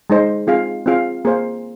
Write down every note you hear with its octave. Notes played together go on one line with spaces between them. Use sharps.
G#3 D#4 C5 D#5
C4 F4 G#4 F5
C4 F4 G#4 F5
A#3 G#4 C5 F5